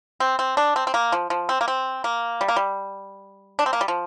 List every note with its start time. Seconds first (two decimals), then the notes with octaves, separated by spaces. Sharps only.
0.20 C4
0.39 C4
0.57 D4
0.76 C4
0.87 C4
0.94 A#3
1.12 F3
1.30 F3
1.49 C4
1.61 A#3
1.68 C4
2.04 A#3
2.41 G3
2.48 A#3
2.56 G3
3.59 D4
3.66 C4
3.73 A#3
3.81 G3
3.88 F3